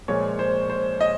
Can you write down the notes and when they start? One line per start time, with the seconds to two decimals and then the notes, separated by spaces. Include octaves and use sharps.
0.08 A#2 F3 G#3 C#5
0.39 C5
0.70 C5
1.01 D#5